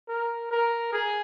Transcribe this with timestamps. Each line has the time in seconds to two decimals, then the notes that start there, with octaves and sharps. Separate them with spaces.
0.08 A#4
0.51 A#4
0.93 G#4